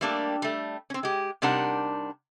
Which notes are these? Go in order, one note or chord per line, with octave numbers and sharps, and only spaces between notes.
G3 A3 A#3 D4 G4
G3 A3
C4 C#4
G#3 G4
C3 G3 D4 D#4 A#4 F#5